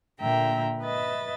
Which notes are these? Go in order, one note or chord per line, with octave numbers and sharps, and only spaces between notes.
A#2 D3 A#3 E5 G5 A#5
B4 D#5 E5 A6